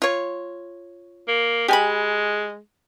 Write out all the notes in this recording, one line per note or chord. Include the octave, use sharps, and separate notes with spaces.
F4 C#5
A#3
G#3 G4 G#5 B5